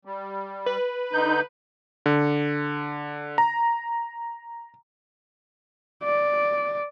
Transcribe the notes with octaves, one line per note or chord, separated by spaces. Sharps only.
G3
B4
D3 D#4 G6
D3
A#5
D5